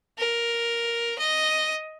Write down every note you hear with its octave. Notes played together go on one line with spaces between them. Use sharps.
A#4
D#5